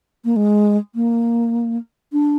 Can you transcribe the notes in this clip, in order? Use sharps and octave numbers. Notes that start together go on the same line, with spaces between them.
A#3
G#3
A#3
D4